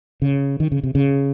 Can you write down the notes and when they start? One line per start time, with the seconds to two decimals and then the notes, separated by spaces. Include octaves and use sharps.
0.22 C#3
0.60 D#3
0.72 C#3
0.83 C3
0.95 C#3